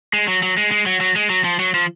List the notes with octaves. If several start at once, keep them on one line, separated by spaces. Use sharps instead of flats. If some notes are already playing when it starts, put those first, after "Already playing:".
G#3
F#3
F#3
G#3
G#3
F#3
F#3
G#3
F#3
F3
F#3
F3